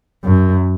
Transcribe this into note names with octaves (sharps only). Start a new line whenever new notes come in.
F#2